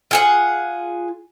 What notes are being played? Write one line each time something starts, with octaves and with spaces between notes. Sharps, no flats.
F4 G#4 F#5